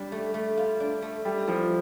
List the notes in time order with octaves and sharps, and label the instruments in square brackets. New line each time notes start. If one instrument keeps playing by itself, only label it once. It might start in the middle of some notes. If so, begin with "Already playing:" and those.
Already playing: [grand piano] G3 [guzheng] D4
[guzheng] A3
A3
F4
D4
A3
[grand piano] G3 [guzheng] A4
[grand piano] F3 [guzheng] E4